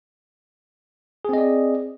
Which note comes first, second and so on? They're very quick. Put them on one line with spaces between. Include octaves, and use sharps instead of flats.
G#4 C4 D#5 D5